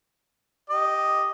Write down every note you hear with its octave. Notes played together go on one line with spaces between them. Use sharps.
G4 D#5